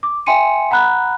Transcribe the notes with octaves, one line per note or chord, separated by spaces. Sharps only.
D6
E5 G5 G#5 C6 C#7 D#7
F#5 A#5 B5 F#6